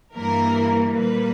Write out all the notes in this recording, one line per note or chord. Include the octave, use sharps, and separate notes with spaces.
G2 E3 G3 A#3 A#4
A#2 G3 A#3 B4